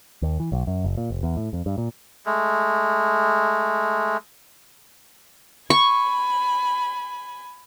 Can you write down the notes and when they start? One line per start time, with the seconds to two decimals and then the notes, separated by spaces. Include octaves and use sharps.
0.22 D#2
0.40 E3
0.52 B1
0.67 F#2
0.84 F#1
0.97 A#2
1.10 F1
1.23 E2
1.37 A2
1.53 F2
1.66 G2
1.78 A#2
2.26 G#3 A3
5.70 G#5 B5 C#6